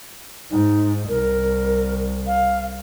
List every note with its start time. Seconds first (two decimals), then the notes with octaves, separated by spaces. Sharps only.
0.51 G#2 D#4
1.09 C2 A#4
2.27 F5